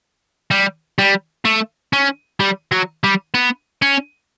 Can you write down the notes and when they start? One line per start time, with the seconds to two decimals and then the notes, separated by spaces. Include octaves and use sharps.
0.51 G3
0.99 G3
1.45 A3
1.93 C#4
2.40 G3
2.72 F#3
3.04 G3
3.35 B3
3.82 C#4